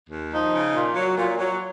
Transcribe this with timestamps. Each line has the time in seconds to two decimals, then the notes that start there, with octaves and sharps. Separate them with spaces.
0.09 D#2
0.31 F3 D#4
0.53 C#3
0.73 A#2
0.95 F#3
1.17 A#2
1.38 F#3